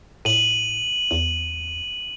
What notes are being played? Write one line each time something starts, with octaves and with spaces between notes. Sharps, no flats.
A2 D#7 F#7
E2